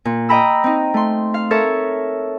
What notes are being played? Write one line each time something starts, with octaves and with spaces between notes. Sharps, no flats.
A#2
D#5 G5 A#5 B5 E6
C4 D#4
A3 C6
F5
A4 A#4 C#5 E5